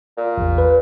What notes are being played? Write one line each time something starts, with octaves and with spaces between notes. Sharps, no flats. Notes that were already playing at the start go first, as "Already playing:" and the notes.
A#2
A1 E2
B4